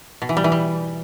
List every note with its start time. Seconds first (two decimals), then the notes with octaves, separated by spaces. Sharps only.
0.22 B2
0.29 E3
0.37 G3
0.44 E3
0.52 G3